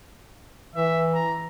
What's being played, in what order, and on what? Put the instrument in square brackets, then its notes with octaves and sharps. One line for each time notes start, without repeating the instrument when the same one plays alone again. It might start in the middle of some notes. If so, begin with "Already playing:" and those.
[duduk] E3 [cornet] E5
[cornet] A#5